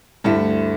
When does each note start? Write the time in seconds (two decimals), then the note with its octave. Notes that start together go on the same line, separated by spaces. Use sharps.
0.24 D2 G2 D3 A3 E4